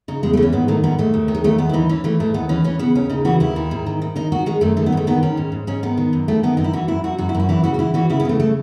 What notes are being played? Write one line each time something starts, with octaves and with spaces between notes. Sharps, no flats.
C#3 D#4
E2 G#3
A3
E3
C#4
G#2 B3
D#3 A3
G#2 B3
G#2 A3
D#2
D#3
G#3
D#2 A3
D#2 B3
E4
E3 D#4
E3 C#4
E3 A3
G#2 A3
D#2 B3
E3 C#4
E3 C#4
C#3 B3
D#2 C#4
C#3 D#4
E3 F#4
D#2 E4
D#3
G#2
D#3
D#3
D#3 D#4
D#3 F#4
D#3 G#3
F#2 A3
D#3 A3
B3
G#2 A3
D#3 B3
D#3 C#4
G#2
G#2
G#2 C#4
D#3 B3
D#3
F#2
D#3 A3
D#3 B3
F#2 D#4
E4
E3 F#4
F#2 E4
F#2 F#4
F#2 F#4
E4
F#2
F#4
E3 E4
C#3 F#4
F#4
E3 E4
E3 F#4
C#3 E4
B3
C#3 A3
A3